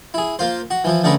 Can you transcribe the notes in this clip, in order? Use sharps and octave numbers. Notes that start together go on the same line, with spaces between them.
E4 G#4
A#3 F4 C5
F#4
E3 F3 E4
D3 A3 C#4 G#4 A#4 B4